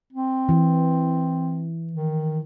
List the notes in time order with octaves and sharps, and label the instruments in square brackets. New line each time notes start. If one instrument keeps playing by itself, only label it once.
[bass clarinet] C4
[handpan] E3
[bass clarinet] D#3